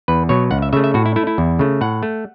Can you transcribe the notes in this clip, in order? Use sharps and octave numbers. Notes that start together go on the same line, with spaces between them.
E2 B4
B2 F#3 C#5
C#2 F#5
E5
C#3 A3 E5
E5
A2 F#4
E4
A3 E4
E4
E2
C#3 A3
A2 F#5
A3